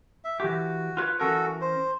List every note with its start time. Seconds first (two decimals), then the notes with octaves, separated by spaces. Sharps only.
0.24 E5
0.40 E3 F#4 G4
0.97 F4 B4 C#5
1.20 E3 C#4 F#4 A4 A#4
1.61 C5